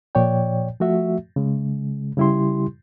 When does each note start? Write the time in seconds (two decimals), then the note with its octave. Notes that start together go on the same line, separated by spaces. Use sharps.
0.15 A#2 F3 C#5 D5 G5
0.80 F3 A3 F#4 E5
1.36 C#3 G#3
2.17 C#3 G3 E4 G4 C6